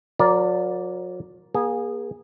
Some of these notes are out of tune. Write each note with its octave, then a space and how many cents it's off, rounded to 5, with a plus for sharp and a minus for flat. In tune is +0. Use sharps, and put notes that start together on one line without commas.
F#3 -40 A#4 +10 D5 -10
A#3 +40 G#4 -20